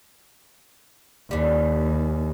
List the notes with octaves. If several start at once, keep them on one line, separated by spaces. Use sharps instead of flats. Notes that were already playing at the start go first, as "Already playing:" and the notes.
D#2 E3 G3